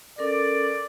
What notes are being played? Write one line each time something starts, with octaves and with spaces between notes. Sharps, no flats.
C#4 A4 A#4 D5